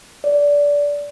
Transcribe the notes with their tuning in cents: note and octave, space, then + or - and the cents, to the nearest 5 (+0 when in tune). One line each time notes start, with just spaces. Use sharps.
D5 -20